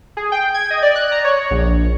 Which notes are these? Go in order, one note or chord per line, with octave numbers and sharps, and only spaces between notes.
G#4
G5
G#6
D#5
D5
F#6
A#5
C#5
A#1